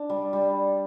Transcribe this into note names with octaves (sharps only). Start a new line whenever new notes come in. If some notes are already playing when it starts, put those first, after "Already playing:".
Already playing: D4
G3
G3